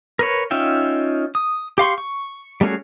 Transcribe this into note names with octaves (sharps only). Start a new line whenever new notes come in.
A#4 B4 C#5
C#4 D#4 F4 E5 G5
D#6
G4 F5 C6 C#6
C#6
G3 A3 C#4 F#4 G#4